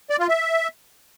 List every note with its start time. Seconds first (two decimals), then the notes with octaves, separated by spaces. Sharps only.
0.10 D5
0.19 F4
0.29 E5